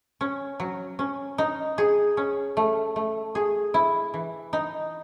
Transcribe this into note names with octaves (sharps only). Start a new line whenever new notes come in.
C#4
F#3
C#4
D#4
G#4
C#4
A3
A3
G#4
E4
E3
D#4